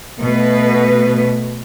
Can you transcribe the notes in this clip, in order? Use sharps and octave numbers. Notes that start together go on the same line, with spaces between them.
B2 A3 B4